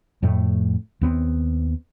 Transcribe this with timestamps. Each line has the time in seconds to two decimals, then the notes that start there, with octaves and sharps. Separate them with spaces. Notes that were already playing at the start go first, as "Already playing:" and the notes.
0.23 F2 A2 A3
1.01 D#2 B3 C4